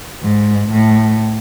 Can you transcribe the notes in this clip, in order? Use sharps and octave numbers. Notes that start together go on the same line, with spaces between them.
G#2
A2